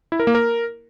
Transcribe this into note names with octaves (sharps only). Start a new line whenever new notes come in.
E4
A#4
A#3
A#4